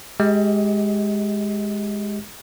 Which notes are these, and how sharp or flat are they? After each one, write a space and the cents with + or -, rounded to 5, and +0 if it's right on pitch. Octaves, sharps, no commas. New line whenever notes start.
G#3 +0 G4 +0 D#5 +30